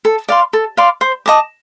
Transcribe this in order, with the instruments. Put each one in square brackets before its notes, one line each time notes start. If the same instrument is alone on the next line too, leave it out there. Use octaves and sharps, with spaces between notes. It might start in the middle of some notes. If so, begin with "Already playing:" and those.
[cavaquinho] A4
D5 F5 C6
A4
D5 F5 C6
C5
D#5 A5 D6